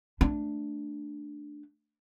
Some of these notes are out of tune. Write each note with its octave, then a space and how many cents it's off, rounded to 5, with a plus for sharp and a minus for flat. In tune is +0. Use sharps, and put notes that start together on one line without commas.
A3 +0 D4 +0